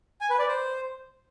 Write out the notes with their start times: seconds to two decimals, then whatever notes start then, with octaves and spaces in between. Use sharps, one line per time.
0.21 G#5
0.30 B4
0.39 D5
0.48 C5